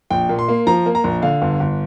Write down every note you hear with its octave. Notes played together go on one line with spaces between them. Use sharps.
A#1 G5
A#2
C6
A#3
F3 A#5
A#3
A#5
A#1
D3 F5
G1
G1